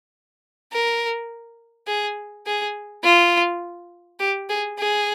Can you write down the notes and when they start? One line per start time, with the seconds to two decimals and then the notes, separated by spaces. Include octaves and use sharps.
0.73 A#4
1.88 G#4
2.47 G#4
3.04 F4
4.20 G4
4.49 G#4
4.79 G#4